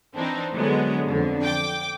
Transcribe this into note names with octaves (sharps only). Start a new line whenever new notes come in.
E3 C4 D4 D#4
D3 F#3 G#3 B3 C#5
F2 D3
G5 D6